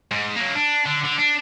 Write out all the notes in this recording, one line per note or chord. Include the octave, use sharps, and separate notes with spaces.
G#2
F#3 A#3
D4
D3
D3
D4